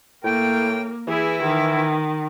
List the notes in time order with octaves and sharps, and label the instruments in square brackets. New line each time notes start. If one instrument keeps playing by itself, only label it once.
[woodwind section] A2 G5 [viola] A#3
[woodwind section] E3 E4 [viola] G#4
[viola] D#3